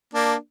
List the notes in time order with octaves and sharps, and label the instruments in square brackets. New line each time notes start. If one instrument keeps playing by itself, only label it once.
[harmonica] A#3 D4